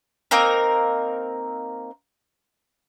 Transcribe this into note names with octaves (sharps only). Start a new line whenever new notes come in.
A#3 C4 D#4 A#4